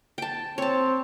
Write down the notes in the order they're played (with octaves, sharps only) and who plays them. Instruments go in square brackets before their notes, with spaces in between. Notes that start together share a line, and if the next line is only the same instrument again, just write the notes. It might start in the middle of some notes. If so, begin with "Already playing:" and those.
[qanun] G5 A5
[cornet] C4 [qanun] C#5 A5